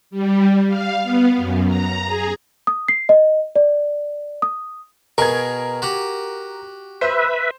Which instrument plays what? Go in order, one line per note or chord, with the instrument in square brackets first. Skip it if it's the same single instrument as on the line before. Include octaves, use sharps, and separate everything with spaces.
[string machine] G3
F5
B3
F#2
A#5
G#4
[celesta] D#6
C7
D#5
D5
D#6
[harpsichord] B2 G#4 C#6 [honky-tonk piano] A#4 G#6
[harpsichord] F#4 G4 F#5
[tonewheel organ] B4 E5 [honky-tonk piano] C5